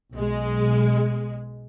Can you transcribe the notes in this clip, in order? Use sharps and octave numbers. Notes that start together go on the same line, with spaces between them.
B1 G#3